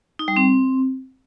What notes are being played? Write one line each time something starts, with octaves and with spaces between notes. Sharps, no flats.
D#4
G3
C4